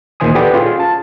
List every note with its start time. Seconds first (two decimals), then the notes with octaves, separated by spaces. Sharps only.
0.20 D2 A#2 D#3 C5 G#5 D#6
0.35 G4 A4 B4 D5 F#5 G5
0.54 C#4 F4 G#4
0.80 A5